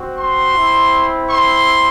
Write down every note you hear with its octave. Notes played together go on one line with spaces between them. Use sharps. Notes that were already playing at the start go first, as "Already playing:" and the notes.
Already playing: C4 F#4
C6
C4 E4
C6